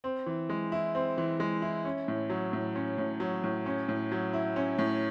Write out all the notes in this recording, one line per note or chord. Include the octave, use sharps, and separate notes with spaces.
C4
E3
G#3
E4
C4
E3
G#3
E4
C#4
A2
F#3
A2
C#4
A2
F#3
A2
C#4
A2
F#3
E4
C#4
A2